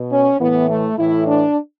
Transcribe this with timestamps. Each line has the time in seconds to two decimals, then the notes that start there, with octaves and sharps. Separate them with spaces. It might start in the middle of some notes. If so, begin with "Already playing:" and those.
Already playing: B2
0.12 C#4
0.41 A2 E3 B3
0.70 A3
0.99 A2 E3 E4
1.27 D4